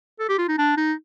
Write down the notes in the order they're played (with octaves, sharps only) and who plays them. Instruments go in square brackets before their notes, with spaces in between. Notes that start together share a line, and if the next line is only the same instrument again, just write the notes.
[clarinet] A4
G4
F4
D#4
D4
D#4